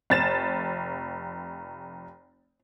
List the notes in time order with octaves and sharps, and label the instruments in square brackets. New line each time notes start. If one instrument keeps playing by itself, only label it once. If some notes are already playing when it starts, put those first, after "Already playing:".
[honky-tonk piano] F1 A6 E7